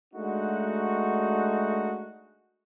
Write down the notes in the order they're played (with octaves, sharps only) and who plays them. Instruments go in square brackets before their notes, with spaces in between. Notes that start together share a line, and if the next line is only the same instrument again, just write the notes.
[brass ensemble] G#3 A3 D4 D#4 F#4